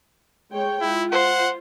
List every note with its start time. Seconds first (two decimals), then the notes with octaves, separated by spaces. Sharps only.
0.51 G#3 C#5 G5
0.81 E4 F4
1.12 C5 F#5